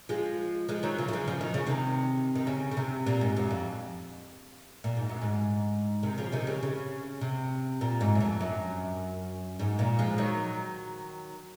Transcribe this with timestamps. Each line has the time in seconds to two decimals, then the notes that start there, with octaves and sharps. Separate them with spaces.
0.09 F3 G#3
0.69 F3 G#3
0.83 D#3 F#3
0.99 C#3 F3
1.08 D#3
1.13 C#3 F3
1.28 F3
1.41 D#3
1.54 C#3
1.66 C3 D#3
2.35 D#3
2.47 C#3
2.71 C#3
2.77 C3
3.06 A#2
3.21 G#2
3.36 F#2
3.51 F2
4.84 A#2
4.97 G#2
5.09 F#2
5.21 G#2
6.03 C3 D#3
6.18 C#3 F3
6.32 C3 D#3
6.47 C#3
6.63 C#3
7.21 C3
7.81 A#2
8.01 G#2
8.15 F#2
8.20 F2
8.41 F#2
9.59 G#2
9.79 A#2
9.99 F3 G#3
10.18 D#3 F#3